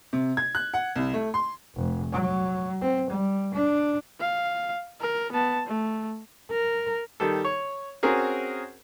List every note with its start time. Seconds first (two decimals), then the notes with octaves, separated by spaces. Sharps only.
0.13 C3
0.37 G#6
0.55 F#6
0.74 F#5
0.96 C2
1.14 A3
1.34 C6
1.75 F1
2.12 F#3
2.81 C4
3.10 G3
3.54 D4
4.20 F5
5.00 A#4
5.32 B3 A5
5.67 A3
6.51 A#4
7.20 D#3 G3 A4
7.44 C#5
8.03 C4 C#4 F#4 G#4 A#4